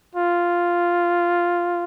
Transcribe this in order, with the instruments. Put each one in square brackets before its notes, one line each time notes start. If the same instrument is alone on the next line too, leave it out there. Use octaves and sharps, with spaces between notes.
[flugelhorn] F4